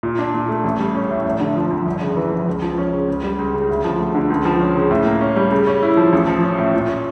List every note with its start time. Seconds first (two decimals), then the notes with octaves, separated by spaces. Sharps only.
0.03 A#2
0.18 D4
0.34 A#2
0.49 A3
0.64 A1
0.80 G3
0.95 C#4
1.11 A2
1.25 F1
1.41 D3
1.56 F3
1.71 F2
1.86 G1
2.01 C#3
2.17 E3
2.31 F2
2.47 C#2
2.62 F3
2.78 C#4
2.93 C#3
3.08 C#2
3.23 G3
3.38 C#2
3.54 C#3
3.69 D2
3.84 F3
3.99 A3
4.15 D3
4.30 C#2
4.45 F3
4.61 C#4
4.76 C#3
4.91 A2
5.06 A#3
5.21 C#4
5.36 G3
5.51 C#3
5.67 C#4
5.82 E4
5.97 F3
6.13 A1
6.27 F3
6.43 C#4
6.59 A2
6.74 A#2
6.88 C#4